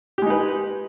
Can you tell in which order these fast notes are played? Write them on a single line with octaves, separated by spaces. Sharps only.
G4 G#3 D#4 B4